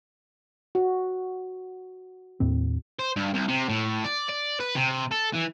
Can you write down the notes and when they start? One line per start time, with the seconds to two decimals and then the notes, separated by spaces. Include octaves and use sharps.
0.75 F#4
2.40 D#2 A2 C4
2.99 C5
3.16 G2
3.34 C2
3.48 C3
3.69 A2
4.04 D5
4.29 D5
4.60 B4
4.76 C3
5.11 A4
5.33 E3